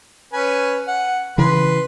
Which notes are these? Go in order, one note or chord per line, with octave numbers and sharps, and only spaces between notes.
C#4 B4 G#5
F#5
C#3 E3 B4 C6